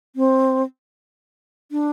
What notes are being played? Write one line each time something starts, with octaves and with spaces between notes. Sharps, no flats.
C4
D4